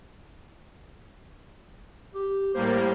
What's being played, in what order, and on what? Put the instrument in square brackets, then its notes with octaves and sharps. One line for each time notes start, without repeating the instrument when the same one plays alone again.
[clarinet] G4
[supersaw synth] A2 G3 A#3 [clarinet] C5